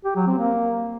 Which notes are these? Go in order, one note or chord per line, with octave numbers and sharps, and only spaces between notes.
G4
F#3
C4
A#3